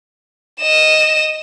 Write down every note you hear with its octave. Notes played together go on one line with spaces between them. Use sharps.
D#5 E7